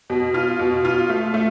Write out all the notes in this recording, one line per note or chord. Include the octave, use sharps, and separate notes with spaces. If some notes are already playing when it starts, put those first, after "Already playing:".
B2
F4
B2
F4
A3
A3